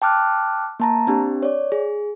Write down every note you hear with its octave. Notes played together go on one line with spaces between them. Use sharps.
G5 A5 D6 F6 F#6
A#3 A5 A#5
C4 D4 G4
C#5 D5
G#4